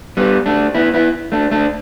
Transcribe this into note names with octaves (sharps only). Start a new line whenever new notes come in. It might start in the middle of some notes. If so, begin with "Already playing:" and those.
G3 B3
A3 D4
B3 E4
B3 E4
A3 D4
A3 D4